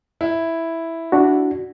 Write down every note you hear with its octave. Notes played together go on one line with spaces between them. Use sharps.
E4
D4 F#4